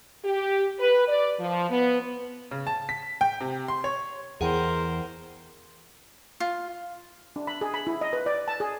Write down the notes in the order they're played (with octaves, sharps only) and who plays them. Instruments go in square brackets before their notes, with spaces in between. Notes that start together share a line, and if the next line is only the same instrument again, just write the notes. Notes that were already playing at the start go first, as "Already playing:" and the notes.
[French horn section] G4
B4
D5
F3
B3
[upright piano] C#3
A5
B6
G5
C3
C6
C#5
[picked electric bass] E2 E3 [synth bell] G#4 F#5 G5 [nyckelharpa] A#4 C5
[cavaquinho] F4
[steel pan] D4
B5
G#4
B5
E4
D#5
B4
D5
A5
G#4